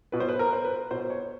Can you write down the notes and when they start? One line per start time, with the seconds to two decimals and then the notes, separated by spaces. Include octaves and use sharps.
0.12 B2 B4
0.20 C5
0.29 B4
0.39 A#4
0.53 C5
0.65 B4
0.91 B2 C5
1.10 C#5